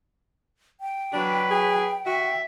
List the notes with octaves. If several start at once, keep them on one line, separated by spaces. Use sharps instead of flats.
G5
F#3 D4 B4
G#4
F#4 E5